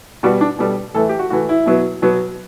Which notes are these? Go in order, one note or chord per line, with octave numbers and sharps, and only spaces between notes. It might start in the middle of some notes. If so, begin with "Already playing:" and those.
B2 G3 B3 F#4
D4
B2 G3 B3 A4
A2 E3 A3 A4
G4
F#4
A2 E3 A3 F#4
E4
B2 F#3 B3
B2 F#3 B3